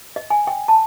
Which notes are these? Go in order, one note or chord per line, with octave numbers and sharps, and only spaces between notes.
D#5
G#5
G5
A5